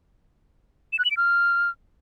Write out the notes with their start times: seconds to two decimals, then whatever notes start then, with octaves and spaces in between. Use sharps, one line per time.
0.93 E7
0.99 F#6
1.05 F#7
1.11 D7
1.17 F6